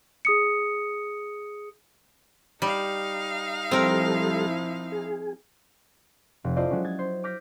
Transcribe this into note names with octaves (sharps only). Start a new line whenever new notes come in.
G#4 D#6 C#7
G3 D#4 F5
F3 G3 C4 E4 A4 A#4
G#4
F1
E4 F4 A4 C5 D5 D#5
F#3 G#3 C#4
G#6 A6
C5
D6 F6 G6 A#6 B6